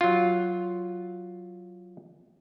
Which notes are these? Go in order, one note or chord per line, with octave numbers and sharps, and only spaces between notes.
F#3 F4